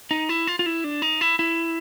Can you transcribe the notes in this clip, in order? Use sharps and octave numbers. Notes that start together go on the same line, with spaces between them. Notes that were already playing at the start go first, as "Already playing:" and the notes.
D#4
E4
F4
F4
E4
D4
D#4
E4
E4